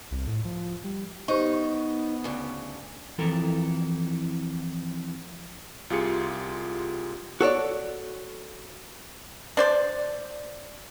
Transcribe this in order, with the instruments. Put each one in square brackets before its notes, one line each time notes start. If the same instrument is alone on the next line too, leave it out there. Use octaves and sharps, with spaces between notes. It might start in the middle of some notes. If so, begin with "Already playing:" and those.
[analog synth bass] C2
A2
F3
G3
[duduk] B3 [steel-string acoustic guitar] D#4 [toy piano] G4 C5 C#6
[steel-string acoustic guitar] D2 C#3
[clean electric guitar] F2 E3 E4 A4 A#4
[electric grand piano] C2 F4 G4 G#4 C#7
[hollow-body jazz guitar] F#4 A4 C#5 D5
[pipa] D4 C5 D5